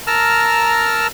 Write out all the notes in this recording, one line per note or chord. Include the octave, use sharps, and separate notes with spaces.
A#4 A5 A#5 E6 F6